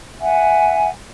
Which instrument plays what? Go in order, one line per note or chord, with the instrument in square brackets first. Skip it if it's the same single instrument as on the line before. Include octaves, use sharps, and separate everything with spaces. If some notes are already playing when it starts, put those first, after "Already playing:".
[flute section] E5 F#5 G#5